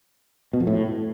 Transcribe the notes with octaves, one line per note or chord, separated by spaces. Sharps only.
B2
F2
A2